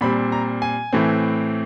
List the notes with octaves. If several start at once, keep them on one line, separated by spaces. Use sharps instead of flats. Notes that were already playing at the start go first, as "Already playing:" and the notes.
A#2 G3 C4 B5
A#5
G#5
A2 E3 A3 C4